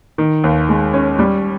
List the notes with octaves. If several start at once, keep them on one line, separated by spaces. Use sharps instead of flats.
D#3
D#2
G#3
C#4
G3